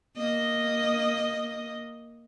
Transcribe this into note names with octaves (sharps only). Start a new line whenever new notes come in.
A#3 D#5